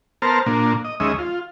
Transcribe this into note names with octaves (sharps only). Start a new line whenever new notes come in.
B3 A#4 C5 A5 F6
A#2 A#3 D4
D#5
D#2 G#3 C#4 D#5 E5
F4